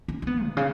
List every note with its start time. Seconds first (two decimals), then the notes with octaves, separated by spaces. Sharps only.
0.08 C#4
0.22 C#4
0.27 B3
0.47 B2
0.57 C#3